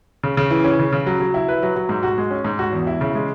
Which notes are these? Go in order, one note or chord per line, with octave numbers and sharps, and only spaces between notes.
C#3
C#3
E3
C#4
C#3
C#3
F#3
F#3
E4
B4
F#3
F#3
G#2
F#4
G#3
C#4
G#2
F#4
E2
E4
C#3
G#3